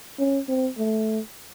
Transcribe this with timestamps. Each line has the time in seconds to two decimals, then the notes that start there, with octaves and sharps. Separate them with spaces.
0.19 C#4
0.48 C4
0.78 A3